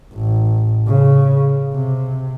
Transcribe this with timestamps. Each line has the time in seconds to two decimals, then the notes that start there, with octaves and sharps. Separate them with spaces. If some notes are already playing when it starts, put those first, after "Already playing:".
0.13 A1
0.87 C#3
1.74 C3